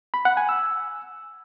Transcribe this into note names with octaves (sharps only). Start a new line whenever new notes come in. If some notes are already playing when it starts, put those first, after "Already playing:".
B5
F#5
G#5
E6